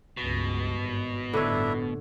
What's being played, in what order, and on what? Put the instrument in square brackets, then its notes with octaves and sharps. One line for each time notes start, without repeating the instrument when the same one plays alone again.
[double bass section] C#2 G2 [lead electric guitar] B2
[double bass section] G#1
[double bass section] G1 A2 [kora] D3 C#5 [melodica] D4 E4 E5